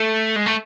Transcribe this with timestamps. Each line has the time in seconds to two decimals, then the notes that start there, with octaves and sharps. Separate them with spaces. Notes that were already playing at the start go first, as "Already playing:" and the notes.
Already playing: A3
0.36 G#3
0.46 A3